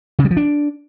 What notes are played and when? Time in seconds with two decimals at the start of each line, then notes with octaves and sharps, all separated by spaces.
0.19 C#3
0.25 G3
0.31 F3
0.37 D4